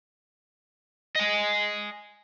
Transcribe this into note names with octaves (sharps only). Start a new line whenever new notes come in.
D#5 G#5